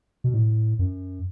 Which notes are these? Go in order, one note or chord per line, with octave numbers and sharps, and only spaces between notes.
B2
A2
F#2